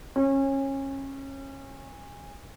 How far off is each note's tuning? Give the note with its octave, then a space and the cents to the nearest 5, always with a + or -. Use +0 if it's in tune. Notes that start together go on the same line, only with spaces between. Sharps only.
C#4 -25